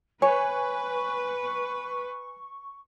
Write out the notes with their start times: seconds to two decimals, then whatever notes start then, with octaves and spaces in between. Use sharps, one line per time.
0.22 B4 C#5 G#5 C#6